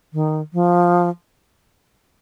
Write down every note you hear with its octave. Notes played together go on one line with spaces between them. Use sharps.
D#3
F3